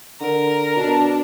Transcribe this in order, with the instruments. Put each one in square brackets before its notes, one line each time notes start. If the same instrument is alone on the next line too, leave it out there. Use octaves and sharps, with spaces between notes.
[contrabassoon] D3 [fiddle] A#4
[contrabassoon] B2 [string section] D4